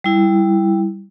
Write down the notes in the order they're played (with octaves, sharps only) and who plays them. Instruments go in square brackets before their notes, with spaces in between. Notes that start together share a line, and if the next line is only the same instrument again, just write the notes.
[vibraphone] G3 E4